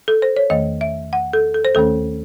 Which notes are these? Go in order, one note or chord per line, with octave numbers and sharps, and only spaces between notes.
A4
C5
C#5
E2 D#3 A3 D#5
E5
F#5
A4
A4
C5
D#2 D#3 A3 C#4 A4